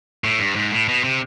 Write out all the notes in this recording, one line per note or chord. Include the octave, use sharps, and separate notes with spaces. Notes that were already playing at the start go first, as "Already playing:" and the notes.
A2
G2
G#2
A2
B2
C3